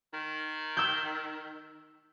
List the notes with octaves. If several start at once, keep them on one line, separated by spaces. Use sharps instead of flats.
D#3
E6 G6